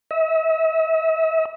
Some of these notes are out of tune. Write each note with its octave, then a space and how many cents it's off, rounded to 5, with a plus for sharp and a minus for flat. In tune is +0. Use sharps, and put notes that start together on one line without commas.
E5 -40